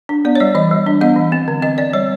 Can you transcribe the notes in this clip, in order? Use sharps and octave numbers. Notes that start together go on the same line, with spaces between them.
D4
B3 D5
C#5
G3 D5
E3 D#5
G3
D4
B3 D#5
E3
C4
D3
C4 D#5
C4 D5
G3 C#5